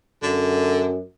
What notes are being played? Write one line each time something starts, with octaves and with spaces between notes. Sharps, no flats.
F#2 D3